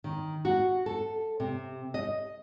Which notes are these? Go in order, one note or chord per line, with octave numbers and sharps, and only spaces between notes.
D#3
F#4
A4
C3
D#5